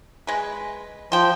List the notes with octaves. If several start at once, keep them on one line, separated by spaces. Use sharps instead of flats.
G#3 B4
F3 C5 G5